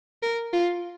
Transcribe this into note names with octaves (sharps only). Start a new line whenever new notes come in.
A#4
F4